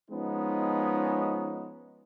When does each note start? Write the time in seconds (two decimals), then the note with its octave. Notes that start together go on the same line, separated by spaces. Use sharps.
0.10 F3 G#3 B3 C#4 D#4